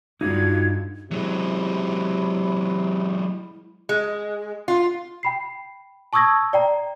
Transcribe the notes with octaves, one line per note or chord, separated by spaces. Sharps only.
G2 D3 D#4 F4 F#4 G#6
C3 F#3 G#3 E4
G#3
F4
G5 B5 C7
A5 C#6 D#6 E6 G#6 A#6
D5 G5 A#5